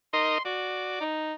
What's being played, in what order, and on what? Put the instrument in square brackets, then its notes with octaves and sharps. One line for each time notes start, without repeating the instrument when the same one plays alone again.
[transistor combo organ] D#4 A#4 D#5 [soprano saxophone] C6
[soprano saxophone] F#4 [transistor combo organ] D5
[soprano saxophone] D#4